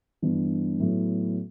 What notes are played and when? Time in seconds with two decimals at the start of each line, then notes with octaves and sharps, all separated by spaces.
0.22 G2 E3 B3 D4
0.79 A2 F#3 B3 E4